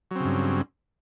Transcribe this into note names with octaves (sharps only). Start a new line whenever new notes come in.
G2 C#3 F#3 C4